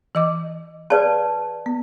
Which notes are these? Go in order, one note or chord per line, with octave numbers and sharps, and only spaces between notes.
E3 D#5 D6
G#4 B4 D5 F5 A5
B3